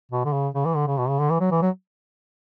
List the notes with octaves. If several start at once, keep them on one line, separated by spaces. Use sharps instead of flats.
B2
D3
C#3
C#3
E3
D3
C#3
B2
C#3
D3
E3
F#3
E3
F#3